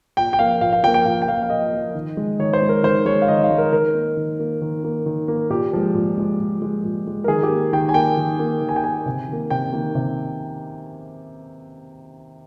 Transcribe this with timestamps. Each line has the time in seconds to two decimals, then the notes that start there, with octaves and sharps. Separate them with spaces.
0.17 A#2 G5
0.33 G5
0.39 F3 A#3 F5
0.61 A#2 F5
0.73 F5
0.83 F3 G5
0.87 A#3
0.94 G5
1.05 A#2 F5
1.22 G5
1.27 F3 A#3 F5
1.43 F5
1.50 A#2 D#5
1.72 F3 A#3
1.95 D#3
2.17 G#3
2.39 D#3 C#5
2.53 C5
2.62 G#3
2.69 A#4
2.83 D#3 C5
3.05 G#3 C#5
3.22 F5
3.28 D#3 D#5
3.43 F5
3.50 G#3
3.58 A#4
3.72 D#3 A#4
3.94 A#3
4.17 D#3
4.39 A#3
4.61 D#3
4.84 A#3
5.06 D#3
5.28 A#3
5.50 A#2 G4
5.73 F3 G#3
5.94 A#2
6.18 F3 G#3
6.39 A#2
6.62 F3 G#3
6.84 A#2
7.06 F3 G#3
7.24 A#4
7.28 D#3 G#4
7.43 G4
7.50 A#3
7.73 D#3 G5
7.89 G#5
7.94 A#3 G5
8.17 D#3
8.39 A#3
8.61 D#3
8.69 G#5
8.76 G5
8.84 A#3 G#5
9.06 C3
9.28 D#3 A#3
9.50 C3 G5
9.73 D#3 A#3
9.95 C3